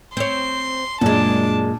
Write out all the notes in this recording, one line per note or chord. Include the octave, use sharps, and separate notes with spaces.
C4 C#5 C6
F#2 A#2 G#3 D4 A5